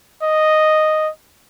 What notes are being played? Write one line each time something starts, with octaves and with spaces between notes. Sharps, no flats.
D#5